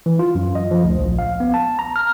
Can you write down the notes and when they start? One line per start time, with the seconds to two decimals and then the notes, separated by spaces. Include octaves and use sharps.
0.06 E3
0.19 F4
0.35 F#2
0.55 D#5
0.71 F3
0.84 D2
0.98 A#1
1.19 F5
1.40 B3
1.54 A5
1.79 A#5
1.96 F6